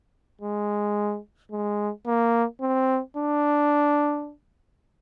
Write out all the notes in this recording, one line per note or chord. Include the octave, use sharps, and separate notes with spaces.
G#3
G#3
A#3
C4
D4